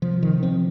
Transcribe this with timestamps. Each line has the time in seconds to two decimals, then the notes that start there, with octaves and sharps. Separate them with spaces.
0.02 C3 F3
0.23 D#3
0.43 F3 C4